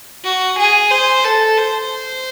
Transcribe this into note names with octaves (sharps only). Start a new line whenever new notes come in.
F#4
G#4
C5
A4
C5